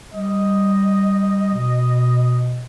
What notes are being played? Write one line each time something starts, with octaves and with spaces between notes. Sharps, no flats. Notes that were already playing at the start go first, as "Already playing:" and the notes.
G3 D#5
B2